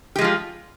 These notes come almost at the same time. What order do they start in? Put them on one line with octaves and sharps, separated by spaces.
G4 G#3 F3 F4